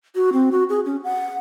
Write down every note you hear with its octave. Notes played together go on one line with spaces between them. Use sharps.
F#4
C4
F#4
G#4
C#4
F#5